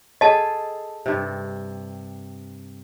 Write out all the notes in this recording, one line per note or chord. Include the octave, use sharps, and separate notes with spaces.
G#4 A4 D#5 A5
G2 C3